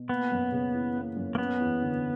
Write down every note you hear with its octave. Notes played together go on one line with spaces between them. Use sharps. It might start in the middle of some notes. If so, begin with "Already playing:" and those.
Already playing: B2
A#3 B3
F#2
C#3
E3
A#3
F#2
A#3
B3 C#4
E2
D3